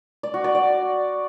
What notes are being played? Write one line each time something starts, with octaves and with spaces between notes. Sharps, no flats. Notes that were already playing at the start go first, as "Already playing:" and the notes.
D5
F#4
D5
D5